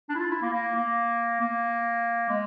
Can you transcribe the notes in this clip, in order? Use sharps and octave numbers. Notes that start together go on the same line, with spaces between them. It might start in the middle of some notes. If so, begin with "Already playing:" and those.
D4
E4
F4
E4
A#3
A#3
A#3
A#3
G#3